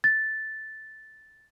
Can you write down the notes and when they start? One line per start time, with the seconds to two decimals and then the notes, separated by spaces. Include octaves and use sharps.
0.04 A6